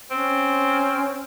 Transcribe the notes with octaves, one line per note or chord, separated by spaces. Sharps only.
C4 C#4